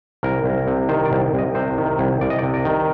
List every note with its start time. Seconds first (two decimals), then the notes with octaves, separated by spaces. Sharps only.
0.23 C2 A#4
0.44 C2
0.67 C3
0.88 D#3 C5
1.05 D5
1.11 C2
1.34 C2 D#5
1.55 C3 C5
1.78 D#3
1.99 C2
2.21 C2 D5
2.30 D#5
2.38 D5
2.43 C3
2.54 D5
2.65 D#3